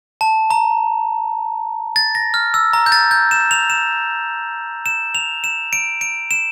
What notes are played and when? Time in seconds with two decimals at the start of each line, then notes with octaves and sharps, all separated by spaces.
0.21 A5
0.50 A#5
1.96 A6
2.15 A#6
2.34 F6
2.54 E6
2.73 A#5
2.86 G6
2.92 A6
3.11 G6
3.31 E7
3.51 F7
3.70 E7
4.86 E7
5.15 F7
5.44 E7
5.73 D7
6.01 D7
6.31 E7